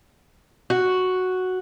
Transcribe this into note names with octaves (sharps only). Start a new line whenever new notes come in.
F#4